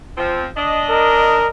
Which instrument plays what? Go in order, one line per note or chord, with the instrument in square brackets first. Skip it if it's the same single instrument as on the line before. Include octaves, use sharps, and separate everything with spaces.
[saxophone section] F3 C4
D4 D#5
[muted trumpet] A#4